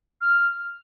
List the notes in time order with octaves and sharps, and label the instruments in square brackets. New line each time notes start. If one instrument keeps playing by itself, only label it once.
[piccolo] F6